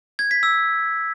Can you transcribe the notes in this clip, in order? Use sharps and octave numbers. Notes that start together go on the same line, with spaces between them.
G#6
B6
E6